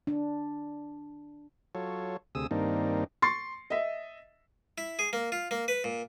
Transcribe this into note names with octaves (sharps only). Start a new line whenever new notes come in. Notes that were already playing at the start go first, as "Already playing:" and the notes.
D4
F#3 F4 A4 C#5
D2 C3 G#4 D#6 E6
G2 D#3 A#3 C4 D4 D#4
C6 C#6 A6 C7
D#5 E5
E4
G#4
A#3
F4
A#3
B4
A#2